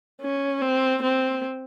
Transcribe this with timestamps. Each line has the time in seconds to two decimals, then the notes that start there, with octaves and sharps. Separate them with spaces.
0.22 C#4
0.62 C4
1.02 C4